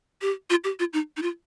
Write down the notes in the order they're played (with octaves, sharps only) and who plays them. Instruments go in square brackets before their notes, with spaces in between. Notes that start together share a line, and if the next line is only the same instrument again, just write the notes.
[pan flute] G4
F4
G4
F4
D#4
D#4
F4